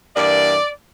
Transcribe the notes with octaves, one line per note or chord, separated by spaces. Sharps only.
G2 E3 A#3 D5